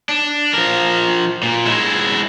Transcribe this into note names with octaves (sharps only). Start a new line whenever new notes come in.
D4
F3 A#4
A#2
G#3 E4